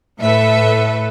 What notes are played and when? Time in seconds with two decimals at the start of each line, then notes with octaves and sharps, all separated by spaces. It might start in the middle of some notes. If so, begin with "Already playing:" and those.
0.20 A2 A4 B4 E5